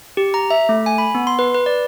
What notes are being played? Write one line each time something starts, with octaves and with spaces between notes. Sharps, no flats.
G4
A#5
E5
A3
G#5
B5
B3
C6
B4
B4
D5